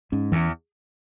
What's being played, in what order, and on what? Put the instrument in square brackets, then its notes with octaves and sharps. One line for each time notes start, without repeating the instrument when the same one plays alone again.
[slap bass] G#2 [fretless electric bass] C#4
[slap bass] E2 [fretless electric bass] E3